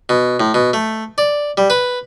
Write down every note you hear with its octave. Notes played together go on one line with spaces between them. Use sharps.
B2
A2
B2
A3
D5
G3
B4